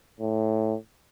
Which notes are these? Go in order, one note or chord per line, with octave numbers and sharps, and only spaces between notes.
A2